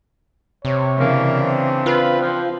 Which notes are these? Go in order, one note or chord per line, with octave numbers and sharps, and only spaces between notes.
C3 C#5
C#3 E3 A#3 D4
C4
F4 B4
F3